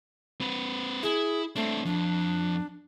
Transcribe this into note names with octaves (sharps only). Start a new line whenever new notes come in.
C4 B4
E4 G#4
A3 C4 D4
F2 D4